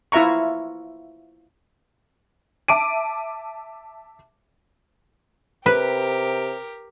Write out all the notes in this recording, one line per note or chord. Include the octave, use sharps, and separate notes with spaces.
E4 F4 E5 A#5 C#6
E5 A5 D6 D7 D#7
C3 G4 A#4 B4